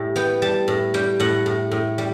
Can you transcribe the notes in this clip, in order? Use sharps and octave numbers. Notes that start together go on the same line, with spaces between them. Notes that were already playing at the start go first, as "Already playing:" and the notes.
Already playing: A2 G3
B3 G5
G3 A5
A2
G3 G5
A2 F#5
A2
A2
G3